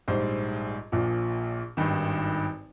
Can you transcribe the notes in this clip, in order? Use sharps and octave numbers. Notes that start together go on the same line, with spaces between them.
A#1 G#2 G3 C5
A#1 A#2 F3
G#1 G2 D#3